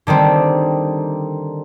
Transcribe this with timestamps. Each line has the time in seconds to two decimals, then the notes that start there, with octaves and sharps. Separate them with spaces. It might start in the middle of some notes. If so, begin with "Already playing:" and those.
0.07 D3 D#3 G3 C4